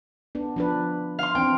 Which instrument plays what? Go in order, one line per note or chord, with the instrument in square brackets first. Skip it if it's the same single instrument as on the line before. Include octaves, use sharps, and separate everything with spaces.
[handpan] B3 D4
F3 D4 B4
[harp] F5 C6
[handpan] E3 C4 D4 [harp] G5